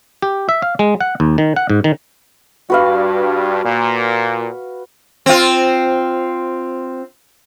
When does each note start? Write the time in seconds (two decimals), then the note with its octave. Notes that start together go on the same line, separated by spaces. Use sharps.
0.22 G4
0.49 E5
0.62 F5
0.79 G#3
1.00 F#5
1.20 D#2
1.38 D#3
1.56 F#5
1.70 G#2
1.84 D#3
2.70 G2 F#4 B4 F5
3.65 A#2
5.26 C4 F4